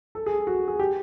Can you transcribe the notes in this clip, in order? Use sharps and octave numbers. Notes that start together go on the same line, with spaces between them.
A4
G#4
F#4
G#4
G4